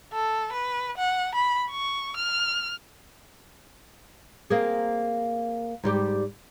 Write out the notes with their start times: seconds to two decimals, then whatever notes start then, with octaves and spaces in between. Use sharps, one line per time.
0.13 A4
0.52 B4
0.98 F#5
1.35 B5
1.71 C#6
2.17 F6
4.50 A#3 C4 G#4
5.83 G#2 G3 G4